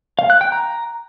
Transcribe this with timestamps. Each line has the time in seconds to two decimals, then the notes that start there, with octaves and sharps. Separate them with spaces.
0.19 F5
0.30 F#6
0.41 G5
0.52 A#5